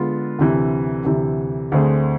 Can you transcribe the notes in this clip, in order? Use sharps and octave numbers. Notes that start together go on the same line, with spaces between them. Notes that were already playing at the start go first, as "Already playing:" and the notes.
Already playing: D3 G#3 B3 F4
D2 C3 E3
D2 C3 E3
D2 D3 A3 C4 G#4